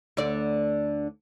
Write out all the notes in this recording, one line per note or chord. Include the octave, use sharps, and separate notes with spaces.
D2 D3 D5